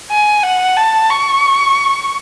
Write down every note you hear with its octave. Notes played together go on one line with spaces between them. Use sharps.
G#5
F#5
A5
C#6